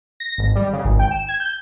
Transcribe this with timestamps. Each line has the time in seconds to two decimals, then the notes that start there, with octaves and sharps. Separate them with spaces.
0.20 A#6
0.38 G#1
0.55 G3
0.73 C#3
0.85 G#1
0.99 G5
1.11 E7
1.29 G#6
1.40 G6